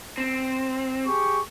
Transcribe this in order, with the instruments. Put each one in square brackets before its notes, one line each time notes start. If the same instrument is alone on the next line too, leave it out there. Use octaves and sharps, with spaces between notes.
[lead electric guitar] C4
[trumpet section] G4 G#4 C#6